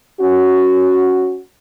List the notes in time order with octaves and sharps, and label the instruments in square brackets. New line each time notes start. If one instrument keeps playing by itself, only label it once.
[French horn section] C#4 F#4